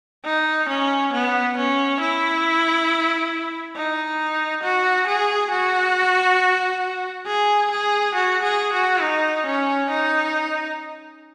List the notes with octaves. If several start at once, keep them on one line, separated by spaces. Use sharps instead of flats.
D#4
C#4
B3
C#4
E4
D#4
F#4
G#4
F#4
G#4
G#4
F#4
G#4
F#4
D#4
C#4
D#4